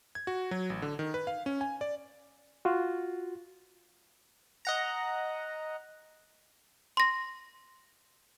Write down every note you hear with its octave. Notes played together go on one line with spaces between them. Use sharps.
G#6
F#4
F#3
A1
D3
D#3
B4
F5
C#4
G#5
D5
F4 F#4
D#5 F#5 A#5
C6 A#6